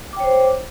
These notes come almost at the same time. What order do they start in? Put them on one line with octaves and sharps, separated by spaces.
D6 G5 C#5 C5